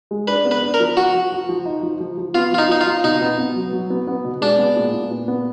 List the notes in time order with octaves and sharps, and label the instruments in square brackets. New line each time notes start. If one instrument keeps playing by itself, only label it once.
[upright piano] G#3
[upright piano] D4 [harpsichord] B4
[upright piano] B3
[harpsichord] B4
[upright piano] D4
[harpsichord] A#4
[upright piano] F3
[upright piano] F3 [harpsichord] F#4
[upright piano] F3
F3
F3
D#4
F3
F3
F3
[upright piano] B3 [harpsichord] F4
[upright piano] F3 [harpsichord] F4
[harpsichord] D#4
[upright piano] F3 [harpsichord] D#4
[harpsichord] F4
[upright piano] F3
[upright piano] B2 [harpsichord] D#4
[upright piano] B3
B3
F#3
F#3
B3
B3
B2
[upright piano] G#3 [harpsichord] D4
[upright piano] B3
A#2
A#2
A#2
B3